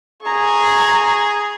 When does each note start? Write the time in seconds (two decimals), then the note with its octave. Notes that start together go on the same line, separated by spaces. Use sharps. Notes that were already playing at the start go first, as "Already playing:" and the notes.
0.23 G#4 A#5 C#6